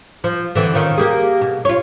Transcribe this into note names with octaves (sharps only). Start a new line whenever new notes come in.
F3
D3 E3 C4
D#3 C#4 F4
A#3 G4 G#4
B2
F4 C#5